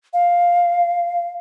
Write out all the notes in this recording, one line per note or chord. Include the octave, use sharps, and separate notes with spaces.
F5